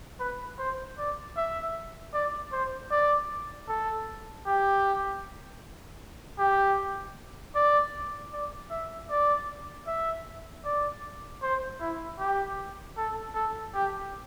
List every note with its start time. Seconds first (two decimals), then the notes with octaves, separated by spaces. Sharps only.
0.20 B4
0.59 C5
0.98 D5
1.37 E5
2.14 D5
2.52 C5
2.91 D5
3.68 A4
4.46 G4
6.39 G4
7.55 D5
8.33 D5
8.71 E5
9.10 D5
9.87 E5
10.65 D5
11.42 C5
11.81 E4
12.19 G4
12.97 A4
13.35 A4
13.74 G4